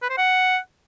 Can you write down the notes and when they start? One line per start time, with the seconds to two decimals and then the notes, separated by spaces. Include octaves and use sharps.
0.03 B4
0.10 C5
0.18 F#5